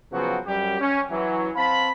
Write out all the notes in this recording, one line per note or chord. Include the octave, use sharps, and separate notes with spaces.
C#3 F3 F#3 B3 C4 F#4
F#2 G3 G4
C#4
E3 F#3
C4 F5 A5 B5